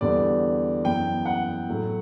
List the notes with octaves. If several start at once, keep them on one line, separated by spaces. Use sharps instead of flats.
E2 D3 G3 D5
F#2 E3 B3 G5
F#5
A2 F#3 A3